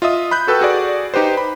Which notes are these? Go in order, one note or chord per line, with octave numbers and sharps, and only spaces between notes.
F4 D#5 E5 D#6
B5 F#6 G6
F#4 A4 B4 G5 E6
F#4 G#4 D5
D#4 G4 B4 C5
B5